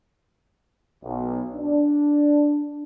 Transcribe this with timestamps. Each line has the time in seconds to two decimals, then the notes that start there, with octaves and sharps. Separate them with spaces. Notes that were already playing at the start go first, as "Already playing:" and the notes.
1.03 B1
1.56 D4